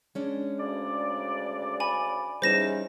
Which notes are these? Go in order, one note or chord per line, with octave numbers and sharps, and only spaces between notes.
G#3 C#4 D4
D2 C#3 D5
G#5 B5
E2 G3 C#4 D#4 C5 A#6 E7